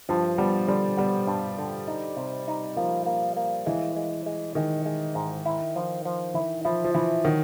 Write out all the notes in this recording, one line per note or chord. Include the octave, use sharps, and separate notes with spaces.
G2 F3
G3 B3
D3 G3
G3 B3
G2
D3
D#4
C3
D#4
F3 A#3
A#3
A#3
E3 G#3
G#3
G#3
D#3 G#3
G#3
G#2
E4
F3
F3
E3 E4
F3 E4
F3
E3 E4
D#3 F#3